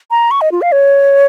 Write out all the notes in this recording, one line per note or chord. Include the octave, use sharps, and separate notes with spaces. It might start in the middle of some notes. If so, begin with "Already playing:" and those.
A#5
C#6
D#5
F4
F5
C#5